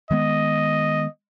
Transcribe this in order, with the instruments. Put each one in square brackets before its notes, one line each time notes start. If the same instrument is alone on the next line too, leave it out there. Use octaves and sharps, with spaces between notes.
[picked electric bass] D#3 G#3 B3 [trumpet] D#5